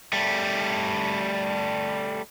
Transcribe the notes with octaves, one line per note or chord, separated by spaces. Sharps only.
G3 A3